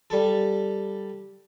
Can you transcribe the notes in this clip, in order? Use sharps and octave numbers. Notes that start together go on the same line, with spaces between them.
G3 A4